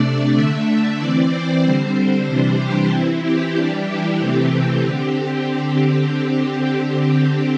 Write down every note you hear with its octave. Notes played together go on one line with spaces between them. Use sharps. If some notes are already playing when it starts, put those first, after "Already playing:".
Already playing: C3 A3 D4 D5
D3 A3 D4 E5
E3 C4 D5
C5
D3 G3 C4
C3 E3 G3 D4
G4
E3 C4 E4
G4
E3 G3 D4
E4
C3 E3 A3 C4 G4
D3 C4 G4